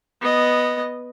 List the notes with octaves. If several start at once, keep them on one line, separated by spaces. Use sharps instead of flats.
B3 D#5